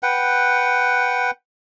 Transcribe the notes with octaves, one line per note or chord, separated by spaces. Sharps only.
B4 F#5 G5